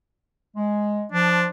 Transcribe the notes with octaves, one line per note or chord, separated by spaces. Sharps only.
G#3
F3 D4